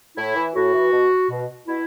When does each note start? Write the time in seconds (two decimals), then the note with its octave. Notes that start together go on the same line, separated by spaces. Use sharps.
0.17 A2 E4
0.35 E3
0.54 A2 F#4
0.73 E3
0.92 B2
1.30 B2
1.67 B2 E4